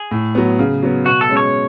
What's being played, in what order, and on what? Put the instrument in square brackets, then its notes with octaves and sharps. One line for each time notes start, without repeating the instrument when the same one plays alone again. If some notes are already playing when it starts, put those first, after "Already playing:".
Already playing: [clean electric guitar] G#4
[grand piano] A2
F#3 B3
C#3
F#3 B3
[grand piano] B2 [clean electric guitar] F#4
[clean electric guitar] A4
[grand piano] G#3 C#4
[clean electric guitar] C#5